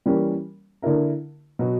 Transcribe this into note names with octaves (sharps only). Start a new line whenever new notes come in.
E3 G3 A#3 C#4
D3 A#3 E4 A#4
B2 F#3 B3